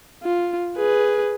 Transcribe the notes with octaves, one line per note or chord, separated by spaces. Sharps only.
F4
G#4 B4